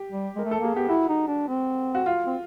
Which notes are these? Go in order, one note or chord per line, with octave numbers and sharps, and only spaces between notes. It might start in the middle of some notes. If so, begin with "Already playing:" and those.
Already playing: G4
G3
G#3 A#4
A3
A4
A#3 G#4
B3 G4
E4 F#4
D#4
D4
C4
F#4
F4
C4